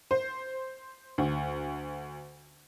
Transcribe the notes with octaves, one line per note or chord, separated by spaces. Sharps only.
C5
D2